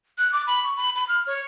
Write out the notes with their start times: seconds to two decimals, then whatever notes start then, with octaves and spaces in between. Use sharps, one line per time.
0.18 F#6
0.33 D6
0.47 B5
0.64 C#6
0.76 B5
0.95 B5
1.08 F6
1.27 C#5